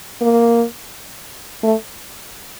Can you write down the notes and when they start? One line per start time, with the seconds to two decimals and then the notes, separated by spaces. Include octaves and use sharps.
0.21 A#3
1.63 A3